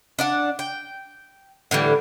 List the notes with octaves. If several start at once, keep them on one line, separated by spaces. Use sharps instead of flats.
D4 D5 F#5
G5
A2 D3 E3 G3